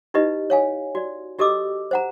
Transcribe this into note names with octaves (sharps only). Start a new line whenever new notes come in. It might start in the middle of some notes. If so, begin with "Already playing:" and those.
D#4 E4 G4 B4 D#5
C#5 F5 G#5
F#4 D5
F#4 G4 A4 D#5 D6 E6
C5 F#5 A#5